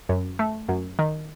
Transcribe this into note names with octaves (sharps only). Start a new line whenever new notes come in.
F#2
A3
F#2
D#3